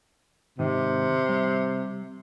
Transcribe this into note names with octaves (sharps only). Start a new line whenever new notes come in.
G#2 C3 D#3 D#4
G3 C#5 E5